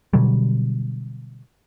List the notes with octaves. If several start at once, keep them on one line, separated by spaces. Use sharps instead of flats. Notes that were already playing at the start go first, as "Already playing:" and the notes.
B2 D3 F#3 G3